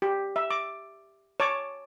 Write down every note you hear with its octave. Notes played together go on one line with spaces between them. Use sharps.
G4
E5
D6
C#5 A5 D6